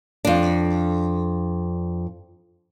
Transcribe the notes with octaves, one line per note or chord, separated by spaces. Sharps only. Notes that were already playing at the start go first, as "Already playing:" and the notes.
F2 D4